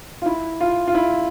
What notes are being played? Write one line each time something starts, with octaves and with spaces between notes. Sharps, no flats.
F4
E4
F4
F4
E4